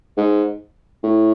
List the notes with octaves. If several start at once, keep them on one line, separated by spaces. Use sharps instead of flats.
G#2
A2